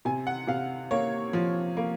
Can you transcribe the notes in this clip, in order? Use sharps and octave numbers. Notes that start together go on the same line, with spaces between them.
C3 G#5
F#5
C3 F5
A#3 C#5
F3
A#3